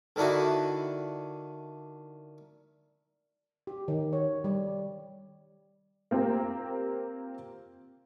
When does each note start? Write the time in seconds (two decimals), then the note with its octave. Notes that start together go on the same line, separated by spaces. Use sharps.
0.16 D3 D#3 D4 E4 F#4
3.67 G4
3.88 D#3
4.13 C#5
4.44 G3
6.11 A#3 C4 F4 G4 A#4